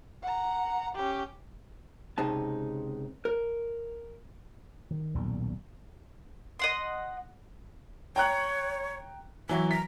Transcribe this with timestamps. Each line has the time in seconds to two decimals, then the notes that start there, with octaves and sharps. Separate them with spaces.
0.23 F#5 A#5
0.96 C#4 G4
2.18 C#2 C3 G#3 D#4 A5
3.25 A#4
4.91 D#3
5.15 D#1 B1 A#2 G3
6.59 D#5 F#5 C6
8.16 C#5 G5 A#5 F#6
9.49 E3 F#3 E4 F#4
9.71 A#5 B6